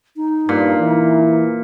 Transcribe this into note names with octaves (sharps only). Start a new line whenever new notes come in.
D#4
G2 A#2
E3